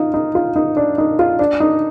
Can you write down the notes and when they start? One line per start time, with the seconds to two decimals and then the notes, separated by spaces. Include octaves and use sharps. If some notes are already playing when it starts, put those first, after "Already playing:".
Already playing: D#4 F4
0.14 D#4
0.35 F4
0.56 D#4
0.77 D4
0.98 D#4
1.19 F4
1.39 D4
1.60 D#4